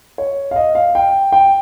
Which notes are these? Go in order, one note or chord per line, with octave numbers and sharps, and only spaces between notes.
C#5
F5
D#5
F5
G5
G5